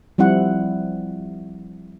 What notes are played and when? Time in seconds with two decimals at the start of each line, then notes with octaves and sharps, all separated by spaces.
0.18 F3 G3 C4 E4 F#5